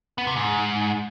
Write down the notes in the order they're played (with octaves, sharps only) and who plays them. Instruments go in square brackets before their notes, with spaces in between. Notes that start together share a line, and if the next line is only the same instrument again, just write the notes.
[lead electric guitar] B3
C3
G#2